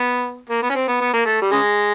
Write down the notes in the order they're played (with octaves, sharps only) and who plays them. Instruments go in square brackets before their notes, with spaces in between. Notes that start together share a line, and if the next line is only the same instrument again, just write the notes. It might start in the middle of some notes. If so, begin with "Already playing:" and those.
Already playing: [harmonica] B3
A#3
B3
C#4
C4
B3
B3
A#3
A3
G3
C#3 G#3